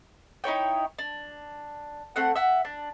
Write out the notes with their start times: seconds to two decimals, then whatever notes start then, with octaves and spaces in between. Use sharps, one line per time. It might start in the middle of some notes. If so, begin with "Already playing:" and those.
0.44 D#4 E4 C#5 G5
0.99 D4
2.16 A3 C4 F#5
2.35 E5 F#5
2.65 D4